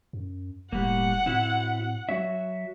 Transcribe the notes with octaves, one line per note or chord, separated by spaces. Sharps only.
F#2
E1 A2 G3 A#3 F#5
A2 C4 E4 F#4
F#3 F#4 C#5 E5